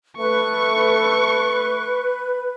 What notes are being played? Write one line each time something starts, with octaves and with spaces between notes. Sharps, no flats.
A3 B4 C#6